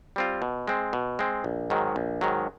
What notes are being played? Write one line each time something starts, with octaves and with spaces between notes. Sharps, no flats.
G3 C4 F4
B2
G#3 C4
B2
G#3 C4
A#1
G#2 D#3 F#3
A#1
G#2 D#3 F#3